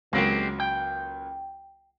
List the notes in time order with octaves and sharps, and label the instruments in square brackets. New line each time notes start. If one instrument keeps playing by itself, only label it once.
[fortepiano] C#2 F#3 A#3 [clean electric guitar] G#3 C4 G4
[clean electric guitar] G5